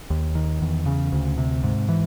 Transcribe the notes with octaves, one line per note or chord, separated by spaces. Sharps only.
D#2
D#3
E2
C#3
D2
C3
G#2
E3